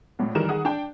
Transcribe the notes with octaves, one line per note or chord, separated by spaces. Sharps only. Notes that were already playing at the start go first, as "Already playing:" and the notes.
A#1 A2
D#3 E3 G3 A#4 E7
D#3 G#4 F#5 D#6
D4 G5